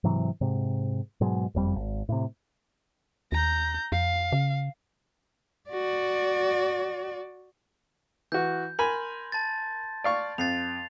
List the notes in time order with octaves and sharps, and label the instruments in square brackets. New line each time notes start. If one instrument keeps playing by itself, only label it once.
[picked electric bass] G#2 C3 E3 F#3
G#2 C3
G#2 B2 F#3 G#3
F#1 F2 G3
G#1
A2 C3
[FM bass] D#2 [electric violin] A#5 G6
[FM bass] F2 [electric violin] F5
[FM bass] C#3
[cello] F#4 D5
[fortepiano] E3 F#4 [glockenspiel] G6
[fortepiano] A#4 G#5 B5 [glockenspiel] C6
[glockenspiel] A5 A6
[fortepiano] D5 F5 C#6
[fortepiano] F2 [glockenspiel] A6 C7 F7